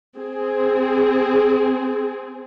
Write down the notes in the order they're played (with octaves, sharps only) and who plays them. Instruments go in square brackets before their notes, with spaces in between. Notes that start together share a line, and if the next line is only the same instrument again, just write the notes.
[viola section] C4 G#4